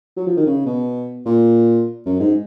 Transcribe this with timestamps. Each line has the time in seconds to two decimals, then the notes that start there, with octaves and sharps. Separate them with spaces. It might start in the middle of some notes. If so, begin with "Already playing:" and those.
0.16 F#3
0.27 F3
0.37 D#3
0.47 C#3
0.66 B2
1.26 A#2
2.06 F#2
2.20 G#2